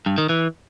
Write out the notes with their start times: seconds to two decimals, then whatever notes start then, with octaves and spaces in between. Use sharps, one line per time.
0.06 G2
0.18 D#3
0.29 E3